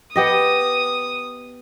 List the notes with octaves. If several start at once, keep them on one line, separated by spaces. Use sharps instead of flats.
B3 G4 D#5 D#6